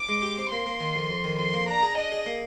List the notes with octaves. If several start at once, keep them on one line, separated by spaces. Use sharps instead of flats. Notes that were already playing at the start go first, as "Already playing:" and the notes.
Already playing: D6
G#3
G4
C4
A#3 C6
A#3
D#3
F2
F2
D#3
F2 C6
A#3
D4 A#5
G#4
D4 D#5
G#4
A#3